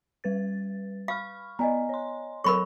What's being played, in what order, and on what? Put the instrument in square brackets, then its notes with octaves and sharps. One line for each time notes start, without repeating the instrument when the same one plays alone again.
[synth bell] G3 B4 A6
[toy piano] F5 [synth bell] B5 C#6 F6
[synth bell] B3 D5 [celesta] D#5 G#5 A#5
[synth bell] C#5 C6
[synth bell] F#3 A4 C#5 [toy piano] A#4 B5 C#6